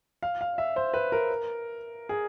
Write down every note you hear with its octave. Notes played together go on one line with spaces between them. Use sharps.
F5
F5
E5
C5
B4
A#4
G#4